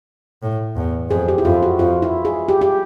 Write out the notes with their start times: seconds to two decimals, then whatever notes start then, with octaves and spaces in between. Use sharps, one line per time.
0.43 A2
0.76 E2
1.10 F2 G#4
1.28 G4
1.38 E4
1.45 F2 F4
1.63 F#4
1.79 F2 F4
2.02 E4
2.25 G#4
2.48 G4
2.61 G4